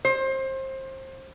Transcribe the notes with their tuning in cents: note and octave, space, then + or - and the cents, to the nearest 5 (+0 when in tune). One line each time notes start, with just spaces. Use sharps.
C5 +25